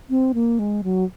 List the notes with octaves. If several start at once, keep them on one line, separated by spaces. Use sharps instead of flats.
C4
A#3
G#3
F#3